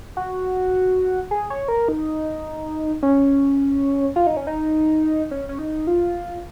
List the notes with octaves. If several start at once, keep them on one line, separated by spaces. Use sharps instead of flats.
F#4
G#4
C#5
A#4
D#4
C#4
F4
D#4
C#4
D#4
C#4
C#4
D#4
F4